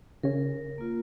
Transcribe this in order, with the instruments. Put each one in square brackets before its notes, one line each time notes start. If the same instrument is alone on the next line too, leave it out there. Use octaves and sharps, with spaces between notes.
[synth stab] C#3 C#4 [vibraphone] A#4
[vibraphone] A#3 F4